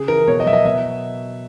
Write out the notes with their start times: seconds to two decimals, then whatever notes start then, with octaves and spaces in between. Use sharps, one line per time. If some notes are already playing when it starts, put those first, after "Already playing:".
Already playing: C#3 G#4
0.08 E3 A#4
0.28 B2 C#5
0.40 D#5
0.46 F#3 E5
0.53 D#5
0.65 B2 E5